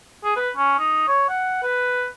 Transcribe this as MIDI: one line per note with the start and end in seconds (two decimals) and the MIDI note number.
0.24 0.35 68
0.37 0.49 71
0.57 0.74 61
0.79 1.03 63
1.08 1.28 73
1.29 1.59 78
1.63 2.07 71